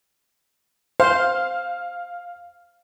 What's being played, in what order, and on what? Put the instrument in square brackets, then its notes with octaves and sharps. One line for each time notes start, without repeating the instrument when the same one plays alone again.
[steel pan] C5 [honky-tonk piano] F5